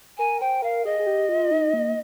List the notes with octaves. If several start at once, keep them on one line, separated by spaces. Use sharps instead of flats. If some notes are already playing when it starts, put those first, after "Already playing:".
A#4 G#5
C5 G5
A#4 F5
G#4 D#5
G#4
G4
F4
D#4
A#3